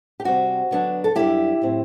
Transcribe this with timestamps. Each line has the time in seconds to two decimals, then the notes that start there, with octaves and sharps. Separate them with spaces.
0.20 G4
0.24 C3 G3 C4 F#4
0.71 D3 F#3 B3 D4
1.04 A4
1.15 F#2 D3 G3 E4 G4
1.62 A2 F#3 C4